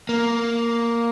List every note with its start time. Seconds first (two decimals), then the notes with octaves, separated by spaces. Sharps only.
0.09 A#3